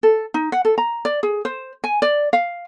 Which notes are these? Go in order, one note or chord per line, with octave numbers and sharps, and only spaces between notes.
A4
D#4
F#5
A4
A#5
D5
G#4
C5
G#5
D5
F5